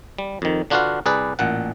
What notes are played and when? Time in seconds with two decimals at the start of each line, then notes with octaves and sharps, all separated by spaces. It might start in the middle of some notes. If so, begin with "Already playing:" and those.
0.18 G3
0.42 F2 D#3
0.70 D3 D4 F4 F#4 B4 F5
1.06 C2 G#4 B4 D5
1.39 A1 A#2 F#5